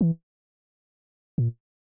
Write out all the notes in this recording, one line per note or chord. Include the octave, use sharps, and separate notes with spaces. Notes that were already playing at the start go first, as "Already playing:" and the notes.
E3
A#2